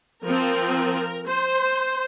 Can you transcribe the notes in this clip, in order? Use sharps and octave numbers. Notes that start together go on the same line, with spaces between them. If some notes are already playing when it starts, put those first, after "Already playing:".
F3 C4 A#4
C5